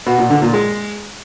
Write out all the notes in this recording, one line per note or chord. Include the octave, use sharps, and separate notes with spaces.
B2
A#2
D3
A#2
G#3